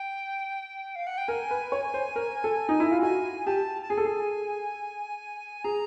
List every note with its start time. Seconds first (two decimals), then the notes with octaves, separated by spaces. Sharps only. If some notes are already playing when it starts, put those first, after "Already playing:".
Already playing: G5
0.95 F5
1.07 F#5
1.18 G5
1.28 A#4 G#5
1.51 B4
1.72 C#5
1.94 C5
2.16 A#4
2.44 A4
2.69 D#4
2.80 E4
2.91 F4
3.02 F#4 G#5
3.46 G4 A5
3.82 A5
3.90 G#4 G#5
3.97 A4
4.05 G#4
5.64 G#4 A#5